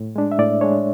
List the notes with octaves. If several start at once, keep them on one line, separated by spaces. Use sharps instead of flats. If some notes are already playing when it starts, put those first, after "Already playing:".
Already playing: A2
G#3 D4
E5
A2 D5
G#3 D4 C#5